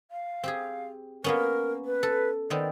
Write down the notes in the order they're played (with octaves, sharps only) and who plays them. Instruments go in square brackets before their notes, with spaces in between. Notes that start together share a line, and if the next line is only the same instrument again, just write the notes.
[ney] F5
[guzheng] C4 G4 G#4
[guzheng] A#3 B3 C#4 [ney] A#4
[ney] B4
[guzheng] A4
[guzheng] D#3 B3 C4 [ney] D5